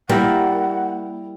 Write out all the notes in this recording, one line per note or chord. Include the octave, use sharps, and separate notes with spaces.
G3 A#3 E4 F#5